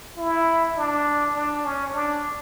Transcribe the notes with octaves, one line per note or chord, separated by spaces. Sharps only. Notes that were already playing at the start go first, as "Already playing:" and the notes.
E4
D4
D4
C#4
D4